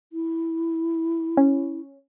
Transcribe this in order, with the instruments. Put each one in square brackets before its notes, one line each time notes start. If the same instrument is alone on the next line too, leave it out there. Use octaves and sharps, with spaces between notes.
[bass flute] E4
[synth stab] C#4